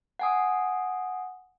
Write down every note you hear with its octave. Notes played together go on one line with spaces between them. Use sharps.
F#5 G#5 D#6